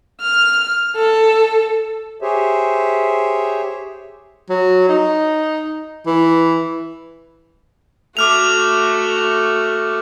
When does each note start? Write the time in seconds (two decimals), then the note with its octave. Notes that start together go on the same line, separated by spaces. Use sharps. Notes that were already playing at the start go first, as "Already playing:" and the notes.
0.21 F6
0.96 A4
2.22 G4 G#4 C5 C#5 E5
4.49 F#3
4.89 D#4
6.06 E3
8.17 A3 F#4 D6 F6 F7